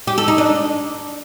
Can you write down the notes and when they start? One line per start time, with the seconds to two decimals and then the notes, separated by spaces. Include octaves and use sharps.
0.07 G4
0.18 A4
0.28 D#4
0.38 D4